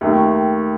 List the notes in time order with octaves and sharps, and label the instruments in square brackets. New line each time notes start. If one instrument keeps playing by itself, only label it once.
[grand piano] D#2 D#3 A3